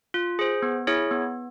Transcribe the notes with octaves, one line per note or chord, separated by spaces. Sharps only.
F4
G#4 C5
B3
E4 G#4 C#5
B3